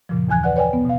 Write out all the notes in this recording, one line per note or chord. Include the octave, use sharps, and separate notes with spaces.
F#2 A#2 C#3 F3
D#2 E3 G#5 F#6 G#6
B4 D5 F#5 F#6
B4 C#5 D5 G5 G#5
B3
B2 F5